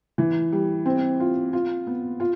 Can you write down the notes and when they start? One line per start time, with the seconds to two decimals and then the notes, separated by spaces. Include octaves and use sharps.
0.18 E3
0.52 G3
0.86 C4
1.20 F4
1.53 F4
1.87 B3
2.20 F4